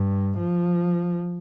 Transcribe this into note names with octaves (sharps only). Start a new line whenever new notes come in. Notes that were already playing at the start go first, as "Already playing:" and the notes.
Already playing: G2
F3